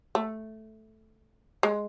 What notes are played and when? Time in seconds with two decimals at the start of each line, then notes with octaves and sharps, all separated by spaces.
0.15 A3
1.63 G#3